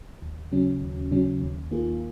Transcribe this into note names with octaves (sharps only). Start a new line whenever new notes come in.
D#2
C#3 F#3 C#4
D#2
C#3 F#3 C#4
D#2
D#3 A#3 F4 G#4